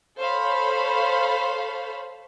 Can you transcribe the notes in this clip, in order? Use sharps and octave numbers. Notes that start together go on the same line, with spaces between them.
A4 C5 C#5 F5 B5